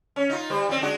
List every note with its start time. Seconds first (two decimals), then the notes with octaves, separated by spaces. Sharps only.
0.16 C#4
0.30 D#4 F4
0.50 G3 C5
0.69 F3 C4
0.81 G#3 D4 F#4